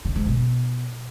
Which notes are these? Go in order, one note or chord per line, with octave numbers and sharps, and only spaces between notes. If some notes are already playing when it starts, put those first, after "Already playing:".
C#3
G#2
B2
B2